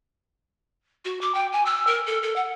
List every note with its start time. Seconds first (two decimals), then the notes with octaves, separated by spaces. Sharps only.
1.05 F#4
1.21 D6
1.35 G5
1.52 G#5
1.66 E6
1.87 A#4
2.07 A4
2.23 A4
2.36 F#5